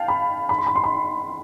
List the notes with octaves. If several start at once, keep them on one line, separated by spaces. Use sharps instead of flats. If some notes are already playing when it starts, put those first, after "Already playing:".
Already playing: F5 G5 A5
B5
B5
C6
B5
C6
B5